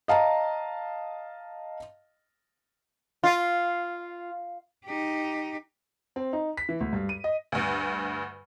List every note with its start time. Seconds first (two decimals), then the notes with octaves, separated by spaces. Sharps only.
0.08 D#5 F5 A5 A#5
3.24 F4
4.85 D#4 G4
6.16 C4
6.33 D#4
6.57 B6
6.69 E3
6.81 D2
6.93 G2
7.09 D#7
7.24 D#5
7.52 D2 G2